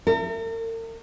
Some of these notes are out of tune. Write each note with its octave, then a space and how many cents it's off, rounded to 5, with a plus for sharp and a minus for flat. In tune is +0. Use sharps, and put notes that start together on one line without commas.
A#4 -45 E5 +20